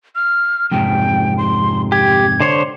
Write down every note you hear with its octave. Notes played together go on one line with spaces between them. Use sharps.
F6
F2 G#2 C3 G5
C6
G4 G#6
D3 C5 C#5